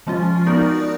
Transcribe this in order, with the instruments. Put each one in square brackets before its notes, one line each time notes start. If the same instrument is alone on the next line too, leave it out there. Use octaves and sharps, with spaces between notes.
[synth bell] F3 G#3 C#4 F4
B3 D#4 F#4 A#4 D5